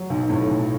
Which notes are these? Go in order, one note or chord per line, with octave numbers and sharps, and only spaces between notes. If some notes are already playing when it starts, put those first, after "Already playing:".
Already playing: F#3
B1
A2
B1